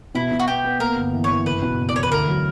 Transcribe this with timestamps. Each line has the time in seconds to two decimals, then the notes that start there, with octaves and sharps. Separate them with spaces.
0.15 B2 E4
0.31 B2
0.40 F#4
0.48 B3 G4
0.64 B3
0.80 A#3 A#4
0.96 G1
1.13 E3
1.24 C#5
1.30 E3
1.46 F#1 B4
1.62 B2
1.79 F#1
1.89 D5
1.95 E2 C#5
2.03 B4
2.11 D2 A#4
2.28 F#3